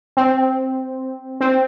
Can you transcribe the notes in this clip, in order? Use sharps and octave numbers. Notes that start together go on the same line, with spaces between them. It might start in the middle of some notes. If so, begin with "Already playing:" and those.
C4
C4